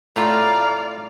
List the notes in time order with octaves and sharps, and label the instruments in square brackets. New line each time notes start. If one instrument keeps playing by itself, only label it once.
[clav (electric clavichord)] A2 A3 F4 [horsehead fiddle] D5 F5 [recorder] A#5